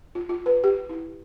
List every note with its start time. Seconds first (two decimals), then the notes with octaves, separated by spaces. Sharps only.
0.15 F4
0.29 F4
0.46 B4
0.64 G4
0.89 E4